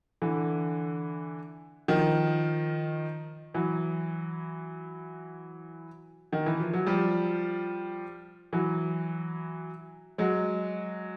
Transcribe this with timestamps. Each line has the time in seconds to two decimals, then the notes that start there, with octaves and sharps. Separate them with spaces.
0.22 D3 E3
1.88 D#3 F3
3.54 E3 F#3
6.33 D#3
6.46 E3
6.60 F3
6.73 F#3
6.86 F3 G3
8.53 E3 F#3
10.18 F#3 G#3